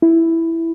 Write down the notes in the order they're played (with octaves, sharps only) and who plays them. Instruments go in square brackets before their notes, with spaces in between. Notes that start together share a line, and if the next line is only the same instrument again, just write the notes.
[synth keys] E4